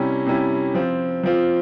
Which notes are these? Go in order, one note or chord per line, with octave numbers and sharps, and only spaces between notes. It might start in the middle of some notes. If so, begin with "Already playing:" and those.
Already playing: C3 G3 C#4 E4
C3 G3 C#4 E4
F3 C4 F4
F3 C4 F4